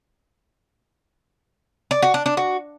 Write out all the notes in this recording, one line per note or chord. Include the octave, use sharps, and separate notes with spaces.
D5
F#4
D4
D4
F#4